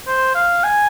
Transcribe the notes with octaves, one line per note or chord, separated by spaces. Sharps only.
C5
F5
G#5